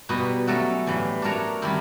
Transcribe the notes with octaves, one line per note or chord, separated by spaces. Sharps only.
B2 G3 B3 D#4 F#4
F#3 A3 C#4 F#4 A4
A2 E3 G3
A3 D4 F#4 A#4 C#5
D#3 G3 C4 E4